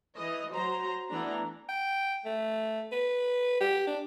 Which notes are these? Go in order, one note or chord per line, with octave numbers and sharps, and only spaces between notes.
E3 D#5
F#3 C5 A#5 C6
E3 A3 B3 D4 A#5
G5
A3
B4
G4
D4